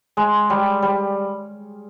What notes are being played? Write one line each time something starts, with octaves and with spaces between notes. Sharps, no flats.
G#3
G3
G3